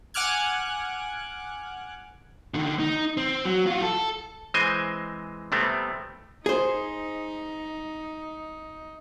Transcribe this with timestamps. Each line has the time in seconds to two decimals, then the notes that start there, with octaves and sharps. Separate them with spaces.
0.14 F#5 G#5 D6 F6 F#6 G#6
2.54 D3 D#3
2.79 D#4
3.17 C4
3.45 F#3
3.67 F4 F#4
3.83 A4
4.54 E3 G#3 C4 C5 D#5 G#5
5.52 C3 G3 A3 B3 C4
6.46 D#4 G#4 C5